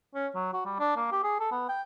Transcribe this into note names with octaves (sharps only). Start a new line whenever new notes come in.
C#4
F#3
F#4
G3
D4
A#3
G4
G#4
A4
B3
G5